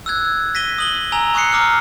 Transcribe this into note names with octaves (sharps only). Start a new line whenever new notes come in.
E6 F#6 G#6
A#6 B6 D#7 G7
D#6 F#7 G7
G#5 A#5 E6 F7
G#5 C#6 D#6 F#6 C7 C#7
A#5 D6 E6 F6